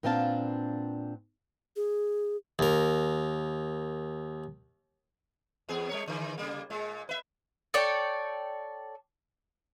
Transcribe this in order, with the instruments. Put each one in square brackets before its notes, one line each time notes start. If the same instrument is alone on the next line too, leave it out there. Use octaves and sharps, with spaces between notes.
[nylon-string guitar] A#2 B3 C4 D4 F5 A5
[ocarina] G#4
[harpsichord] D#2 A#4
[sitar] E2 B3 G#4
G3 A#4 C#5
D3 E3
C#3 G3 A#3
A#2 G#3
B4 E5
[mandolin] A4 C#5 D5 G5